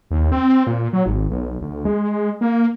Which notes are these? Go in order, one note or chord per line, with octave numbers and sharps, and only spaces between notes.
D#2
C4
A#2
F#3
G#1
B1
D2
G#3
A#3